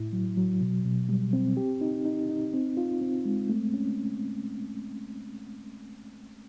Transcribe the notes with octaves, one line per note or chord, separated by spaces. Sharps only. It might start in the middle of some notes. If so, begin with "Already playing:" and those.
Already playing: A2 E4
F#3
F#3
B2
B2
G3
C4
G4
D#4
D#4
D#4
C4
F4
C4
G#3
A3
C#4